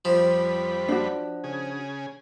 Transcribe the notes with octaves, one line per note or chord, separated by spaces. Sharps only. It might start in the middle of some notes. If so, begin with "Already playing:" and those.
F2 F3 G3 B5
D4 F#4
C#3 G#4